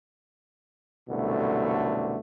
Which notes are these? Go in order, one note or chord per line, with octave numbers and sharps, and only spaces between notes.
C2 F#2 B2 D3 A3